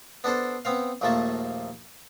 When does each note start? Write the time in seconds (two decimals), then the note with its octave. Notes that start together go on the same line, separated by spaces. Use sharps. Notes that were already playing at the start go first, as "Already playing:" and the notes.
0.24 B3 D4 A4 C5
0.65 B3 C4 F5
1.01 A#1 D#2 F3 A3 A#3 A5